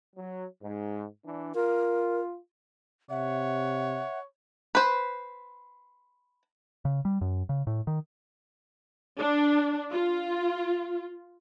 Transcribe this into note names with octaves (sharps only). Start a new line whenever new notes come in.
F#3
G#2
E3 D4
F4 A#4
C3 C#5 E5 F#5
B4 C5
C#3
G3
F#2
C#3
A2
D#3
D4
F4